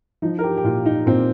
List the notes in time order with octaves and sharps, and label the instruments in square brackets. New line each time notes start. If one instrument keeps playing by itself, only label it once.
[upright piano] F3 D#4
A#4
G4
G4
A#2 F4
D#4
A#2 C4